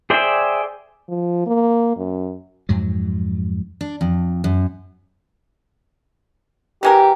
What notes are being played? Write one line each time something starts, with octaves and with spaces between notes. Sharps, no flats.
G#4 C5 D5 E5 G5
F3
A#3
F#2
F2 G#2 F#3
D4
F2
F#2
E3 G#3 G4 A#4